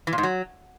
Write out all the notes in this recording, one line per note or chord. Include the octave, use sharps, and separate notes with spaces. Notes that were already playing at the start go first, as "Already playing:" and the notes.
E3
A#2
G#2
F#3